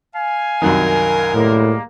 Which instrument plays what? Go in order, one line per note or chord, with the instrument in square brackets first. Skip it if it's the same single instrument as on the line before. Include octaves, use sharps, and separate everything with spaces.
[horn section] F5 G#5
[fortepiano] C2 F#2 D#3 [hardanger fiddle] A#4
[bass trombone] A2 [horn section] G3 G#3 A#3